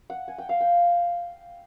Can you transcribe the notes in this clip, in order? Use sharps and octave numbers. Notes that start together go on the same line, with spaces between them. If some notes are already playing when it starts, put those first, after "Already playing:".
F#5
G#5
G5
F5
G5